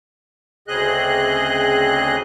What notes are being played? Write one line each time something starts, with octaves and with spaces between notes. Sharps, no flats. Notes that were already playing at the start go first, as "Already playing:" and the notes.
D2 C#3 C4 G#4 D#5 F#6